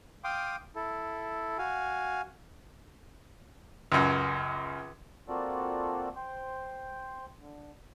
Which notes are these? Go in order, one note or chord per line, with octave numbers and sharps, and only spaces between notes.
F5 G5 C6 D6 D#6
E4 A4
F#4 F5 G#5
C#2 F#2
A#3 C4 F4 F#4 A4 D5
C5 G5
D3